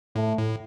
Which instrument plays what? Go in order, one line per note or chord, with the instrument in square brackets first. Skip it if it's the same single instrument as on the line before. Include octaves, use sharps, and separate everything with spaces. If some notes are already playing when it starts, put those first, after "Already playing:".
[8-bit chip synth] A2 [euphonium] A3
[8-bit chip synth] A2